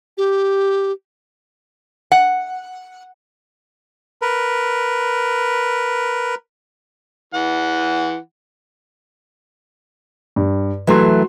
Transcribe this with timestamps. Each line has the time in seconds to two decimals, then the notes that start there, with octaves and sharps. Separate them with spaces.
0.18 G4
2.12 F#5
4.22 A#4 B4
7.34 E3 F#5
10.36 G2
10.87 E3 F#3 A3 F#4 C6